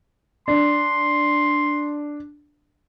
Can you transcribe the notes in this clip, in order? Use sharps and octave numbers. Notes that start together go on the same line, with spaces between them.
D4 C6